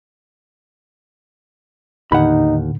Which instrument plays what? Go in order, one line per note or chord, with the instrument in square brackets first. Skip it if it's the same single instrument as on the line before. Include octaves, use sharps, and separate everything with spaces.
[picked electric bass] D#2 [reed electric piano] A2 D3 [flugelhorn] D#4 [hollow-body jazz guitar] F#5 B5